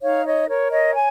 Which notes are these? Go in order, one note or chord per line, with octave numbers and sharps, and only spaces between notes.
D#4 C#5 F5
C#5 D#5
A#4 C#5
C#5 D#5
G#5